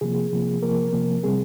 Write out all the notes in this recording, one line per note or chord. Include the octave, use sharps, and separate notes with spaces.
C3 F3 A#3 G#4
C3 F3 A#3
C3 F3 A#3 A#4
C3 F3 A#3
C3 G3 C4 G#4